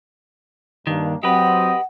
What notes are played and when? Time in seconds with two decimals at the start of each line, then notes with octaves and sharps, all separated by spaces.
0.87 G2 D#3 A#3 D4
1.23 F#3 C4 G4 B4 D#5 F#5